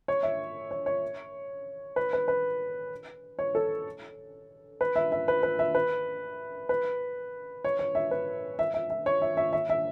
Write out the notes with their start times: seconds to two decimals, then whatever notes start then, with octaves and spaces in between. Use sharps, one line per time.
0.08 C#5
0.23 E5
0.71 C#5
0.86 C#5
1.96 B4
2.13 B4
2.28 B4
3.39 C#5
3.55 A4
4.81 B4
4.96 E5
5.12 E5
5.28 B4
5.43 B4
5.59 E5
5.75 B4
6.69 B4
7.64 C#5
7.79 C#5
7.95 E5
8.11 B4
8.59 E5
8.74 E5
8.90 E5
9.06 C#5
9.22 E5
9.37 E5
9.53 E5
9.69 E5